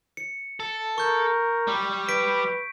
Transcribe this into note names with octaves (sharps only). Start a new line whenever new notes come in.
C#7
A4
A#4 C#6 G6
G3
B4 B6 D7